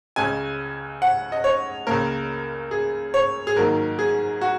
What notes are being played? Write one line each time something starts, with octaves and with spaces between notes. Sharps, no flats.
C#2 C#3 G#3 G#5
F#5
D#5
C#5
C#2 C#3 A#3 A#4
G#4
C#5
G#4
G#2 D#3 F#3 A#3 A#4
G#4
F#4